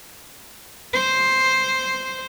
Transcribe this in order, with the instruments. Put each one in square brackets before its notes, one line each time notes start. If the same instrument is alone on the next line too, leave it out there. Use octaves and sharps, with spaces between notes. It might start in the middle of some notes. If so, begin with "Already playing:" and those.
[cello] C5